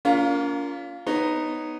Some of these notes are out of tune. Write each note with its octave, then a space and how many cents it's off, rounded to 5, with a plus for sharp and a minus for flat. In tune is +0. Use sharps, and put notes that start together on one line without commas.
A#3 +0 C#4 +45 F4 +0
B3 +10 D#4 -5 C#5 -5